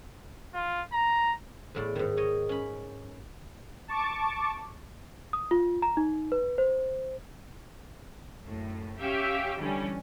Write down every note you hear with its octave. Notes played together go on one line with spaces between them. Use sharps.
F4
A#5
E2 A2 D5
G#2 D#3
C#5 D#5
C#4 B5
A5 C#6 D6
D#6
F4
A#5
D#4
B4
C5
F#2 A2
C#4 G4 E5 F5 G5
D3 E3 G3 C#4